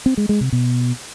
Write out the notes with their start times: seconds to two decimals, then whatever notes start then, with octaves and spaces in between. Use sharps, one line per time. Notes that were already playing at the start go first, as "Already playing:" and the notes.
0.06 C4
0.17 G#3
0.29 G#3
0.41 C3
0.53 B2